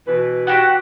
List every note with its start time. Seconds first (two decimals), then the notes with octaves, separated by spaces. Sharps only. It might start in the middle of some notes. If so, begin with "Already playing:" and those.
0.07 B2 E3 B4
0.47 F#4 G4 F#5